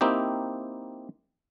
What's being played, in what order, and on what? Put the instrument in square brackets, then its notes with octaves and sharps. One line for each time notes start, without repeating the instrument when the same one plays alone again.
[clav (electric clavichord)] A#3 C4 D#4 E4 G4